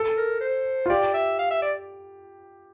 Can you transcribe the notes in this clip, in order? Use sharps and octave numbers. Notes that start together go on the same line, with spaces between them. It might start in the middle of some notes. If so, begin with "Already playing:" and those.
Already playing: A4
A#4
C5
F4
G4 D5
E5
F5
E5
D5